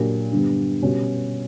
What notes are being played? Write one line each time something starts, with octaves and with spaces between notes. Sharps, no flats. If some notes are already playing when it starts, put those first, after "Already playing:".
Already playing: A#2 F#3 A#3 D4 G4
G2 D3 G3 B3
B2 G3 C#4 F#4